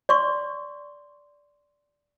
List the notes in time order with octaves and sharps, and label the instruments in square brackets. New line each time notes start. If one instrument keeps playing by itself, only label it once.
[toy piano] D5 C6 C#6